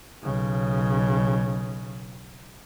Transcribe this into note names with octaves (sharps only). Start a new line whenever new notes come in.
B1 C#3